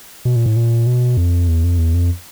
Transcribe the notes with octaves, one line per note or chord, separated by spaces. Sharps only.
B2
A#2
A2
A#2
B2
F2
E2
F2
E2
F2